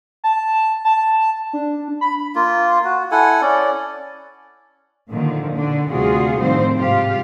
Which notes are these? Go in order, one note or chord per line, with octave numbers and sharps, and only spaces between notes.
A5
A5
D4
B5
A#3 F4
F#4
E4 A4 F#5 G#5
C#4 D5
A#2 D3 D#3 F3
B2 D3 D4
D2 C3 G3 F4 F#4 G#4
A2 D#3 F3 G3 C4 C5
G#2 C3 F4 G4 F5